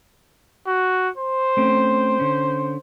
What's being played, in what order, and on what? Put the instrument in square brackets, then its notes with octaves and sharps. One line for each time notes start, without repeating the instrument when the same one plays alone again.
[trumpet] F#4
C5
[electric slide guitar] A3 C4 C#4
D3 C#4